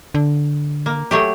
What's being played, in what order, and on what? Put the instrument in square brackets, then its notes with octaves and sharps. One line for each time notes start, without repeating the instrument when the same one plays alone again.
[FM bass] D3
[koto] A#3
F#3 A3 G4